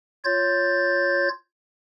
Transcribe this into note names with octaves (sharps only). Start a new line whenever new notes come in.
F4 C#5 G6 A6